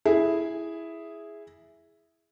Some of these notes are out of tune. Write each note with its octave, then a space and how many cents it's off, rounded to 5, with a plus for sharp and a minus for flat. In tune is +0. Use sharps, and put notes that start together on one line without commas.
E4 +0 G#4 +0